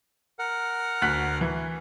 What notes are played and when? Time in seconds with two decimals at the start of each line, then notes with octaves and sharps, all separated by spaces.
0.39 A#4 F#5
1.02 D2 F#6 B6
1.41 E3